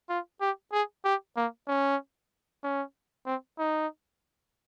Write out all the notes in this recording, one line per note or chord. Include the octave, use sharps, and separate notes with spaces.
F4
G4
G#4
G4
A#3
C#4
C#4
C4
D#4